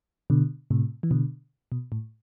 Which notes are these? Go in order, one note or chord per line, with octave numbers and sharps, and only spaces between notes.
B2 D3
A2 C3
E3
B2 D3
B2
A2